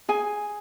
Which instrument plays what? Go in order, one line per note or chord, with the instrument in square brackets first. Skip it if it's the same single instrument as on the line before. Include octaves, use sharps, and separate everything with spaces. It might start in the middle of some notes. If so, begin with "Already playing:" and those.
[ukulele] G#4 G#5